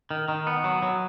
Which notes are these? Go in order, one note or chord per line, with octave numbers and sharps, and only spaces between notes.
D#3
D#3
B3
F#3
F#3